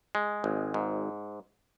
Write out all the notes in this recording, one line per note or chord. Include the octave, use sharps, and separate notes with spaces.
G#3
G#1
G#2